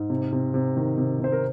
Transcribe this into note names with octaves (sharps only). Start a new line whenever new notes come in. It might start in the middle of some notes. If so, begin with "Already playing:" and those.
Already playing: G#2
C3
C3
C3
D#3
C3
C3 C5
A#4